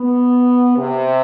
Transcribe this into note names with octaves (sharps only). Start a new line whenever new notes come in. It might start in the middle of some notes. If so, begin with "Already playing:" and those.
Already playing: B3
C3